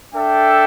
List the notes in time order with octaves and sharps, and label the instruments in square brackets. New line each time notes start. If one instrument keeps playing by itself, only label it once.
[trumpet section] D4 A4 E5 G5